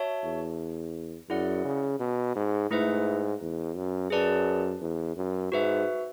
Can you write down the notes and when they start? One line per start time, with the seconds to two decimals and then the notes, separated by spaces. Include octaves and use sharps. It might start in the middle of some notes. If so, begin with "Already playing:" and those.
Already playing: F#4 C#5 E5 A5
0.23 E2
1.29 F#2 E4 G#4 D5 F#5
1.65 C#3
2.00 B2
2.36 G#2
2.71 G#2 A3 E4 B4 E5
3.41 E2
3.76 F#2
4.10 F#2 G#4 B4 D5 A5
4.81 E2
5.16 F#2
5.52 G#2 F#4 B4 E5